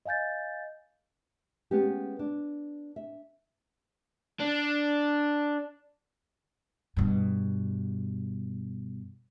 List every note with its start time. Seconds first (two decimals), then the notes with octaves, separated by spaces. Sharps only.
0.06 D#5 F5 G#5 G6 A6
1.71 G#3 B3 C#4 G4
2.19 D4
2.96 E5
4.40 D4
6.97 G2 B2